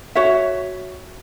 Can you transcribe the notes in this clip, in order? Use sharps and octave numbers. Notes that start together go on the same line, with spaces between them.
F#4 C#5 E5